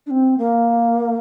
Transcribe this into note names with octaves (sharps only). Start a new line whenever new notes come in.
D4
C4
A#3